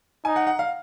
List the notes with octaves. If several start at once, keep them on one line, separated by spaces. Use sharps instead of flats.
D#4 G#5
F#5
F#5
F5